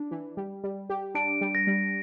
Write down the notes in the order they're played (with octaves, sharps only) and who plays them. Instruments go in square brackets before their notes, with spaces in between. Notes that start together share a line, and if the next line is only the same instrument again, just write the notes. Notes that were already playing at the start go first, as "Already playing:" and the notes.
Already playing: [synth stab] D4
E3
G3
G3
G4
[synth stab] D4 [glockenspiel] D7
[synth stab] G3
[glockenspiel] A#6
[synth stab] G3